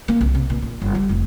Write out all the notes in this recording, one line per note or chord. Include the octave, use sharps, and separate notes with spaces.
A#3
C2
C3
A#2
A#2
G1
G3
F1